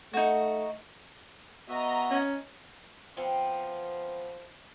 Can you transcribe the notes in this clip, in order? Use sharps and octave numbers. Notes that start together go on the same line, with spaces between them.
A3 D#4 F#4
B3 F#4 D#5 E5 A#5
C#4
F3 B3 C4